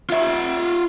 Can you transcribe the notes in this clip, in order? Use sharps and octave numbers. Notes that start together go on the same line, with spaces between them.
F4 E5